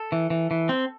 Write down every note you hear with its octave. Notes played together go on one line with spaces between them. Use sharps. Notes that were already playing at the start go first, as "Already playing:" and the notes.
Already playing: A4
E3
E3
E3
C4